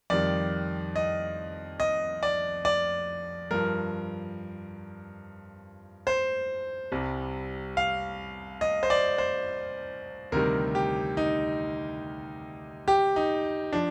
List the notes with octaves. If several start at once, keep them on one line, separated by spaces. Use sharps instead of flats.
F2 D#3 G3 D5
D#5
D#5
D5
D5
G2 F3 A#4
C5
C2 C3 G3
F5
D#5
C5
D5
C5
D2 C3 D#3 G3 A#4
G4
D#4
G4
D#4
F3 D4